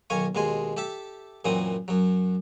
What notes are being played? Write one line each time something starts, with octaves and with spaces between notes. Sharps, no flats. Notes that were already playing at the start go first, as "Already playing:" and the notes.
B1 D#3 C#5 F5 G#5 C#6
D#2 B2 G#3 G#5 C6
G4 A4 E5 A5
F#2 A#2 E3 F#3 C4 D#6
F#2 F#3